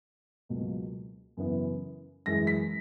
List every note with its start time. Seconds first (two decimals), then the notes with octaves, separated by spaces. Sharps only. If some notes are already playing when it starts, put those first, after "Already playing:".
0.49 C#2 B2 F#3 A#3
1.37 F#2 C#3 E3 B3
2.26 F#2 E3 G#3 A#6
2.47 B6